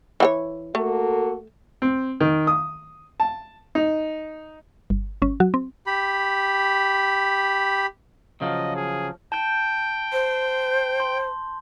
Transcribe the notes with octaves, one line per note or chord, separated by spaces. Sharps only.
E3 F#4 C#5
A3 A#3 F#4 A4
C4
D#3
D#6
A5
D#4
G1
G1 C#4
F#3 F#4
C4
G4 B5
C#3 F3 F#3 D#5
G#4
G5 A5 G6
C5
C6